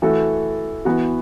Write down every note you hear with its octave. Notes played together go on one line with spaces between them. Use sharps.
E3 A3 F#4 A4
E3 B3 F#4